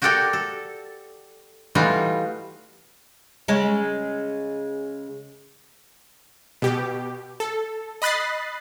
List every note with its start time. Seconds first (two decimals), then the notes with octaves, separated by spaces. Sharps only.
0.02 F#4 G4 A4 A#4 D5 G5
0.33 A4
1.75 E3 G3 A3 D#4 F4 F#4
3.48 C#3 G#3
6.62 B2 G4
7.40 A4
8.02 D#5 B5 F#6 A6 C7